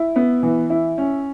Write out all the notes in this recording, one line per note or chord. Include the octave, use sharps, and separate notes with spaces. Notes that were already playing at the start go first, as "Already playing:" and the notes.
Already playing: E4
B3
E3
E4
C#4